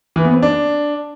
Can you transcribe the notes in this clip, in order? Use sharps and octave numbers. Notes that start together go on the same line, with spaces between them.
E3
B3
C4
D4